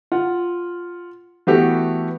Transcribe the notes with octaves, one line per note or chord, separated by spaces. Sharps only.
F4 F#5
E3 A3 B3 F#4 G4 A4